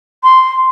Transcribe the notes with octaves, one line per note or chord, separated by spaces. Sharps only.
C6